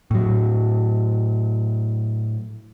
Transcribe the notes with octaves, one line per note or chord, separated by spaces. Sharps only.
A2 F#3